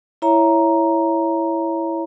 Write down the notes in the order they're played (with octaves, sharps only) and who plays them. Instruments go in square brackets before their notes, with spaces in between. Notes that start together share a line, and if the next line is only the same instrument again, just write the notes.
[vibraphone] E4 C#5 E5 A#5